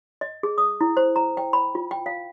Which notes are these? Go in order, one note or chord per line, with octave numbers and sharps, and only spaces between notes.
D#5
G#4
D#6
E4
C5
A#5
G5
B5
F4
G5
F5